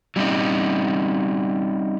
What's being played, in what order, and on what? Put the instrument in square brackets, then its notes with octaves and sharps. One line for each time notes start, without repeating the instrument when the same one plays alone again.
[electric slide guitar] F#3 G3 C4 C#4 D#4